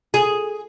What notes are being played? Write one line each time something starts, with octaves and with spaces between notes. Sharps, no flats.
G#4